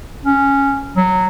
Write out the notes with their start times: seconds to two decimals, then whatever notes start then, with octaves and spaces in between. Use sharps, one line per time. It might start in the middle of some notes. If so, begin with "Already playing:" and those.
0.24 C#4
0.96 F#3